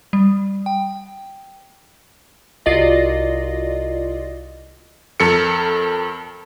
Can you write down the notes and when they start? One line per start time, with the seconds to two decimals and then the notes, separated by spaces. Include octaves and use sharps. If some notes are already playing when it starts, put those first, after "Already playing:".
0.13 G3
0.66 G5
2.66 C2 F4 F#4 D5 D#5 A#6
5.20 F2 A4 A#4 C#7